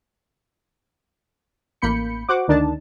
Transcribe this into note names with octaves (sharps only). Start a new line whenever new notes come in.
A1 A#3 B5 G6 C#7
F#4 C5 F#5 D6
D2 D#3 D4 D#4 A5